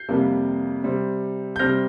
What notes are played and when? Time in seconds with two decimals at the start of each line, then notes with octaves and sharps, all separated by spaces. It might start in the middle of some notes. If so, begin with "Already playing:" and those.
Already playing: G6 C7
0.09 F2 C3 G3 A#3
0.83 C3 G3 C4
1.56 G6
1.59 C3 G3 C4 F6 A#6